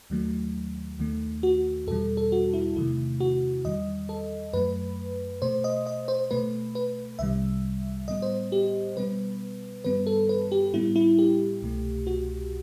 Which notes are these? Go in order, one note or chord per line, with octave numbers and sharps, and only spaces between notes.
D#2 D#3 F#3 A3
D#2 D#3 A3
F#4
E2 B2 G3 A4
A4
F#4
E4
E2 C3 D#3 A3 E4
F#4
E2 D#3 G3 D#5
A4
F#2 F#3 A3 B4
B2 A3 C5
D#5
D#5
C5
B2 A3 B4
B4
C2 C3 D#3 G3 E5
A2 G3 B3 D#5
C5
G4
B2 G3 B3 B4
G2 D#3 G3 B3 B4
A4
B4
G4
A2 G3 B3 E4
E4
G4
C2 B2 A3
F#4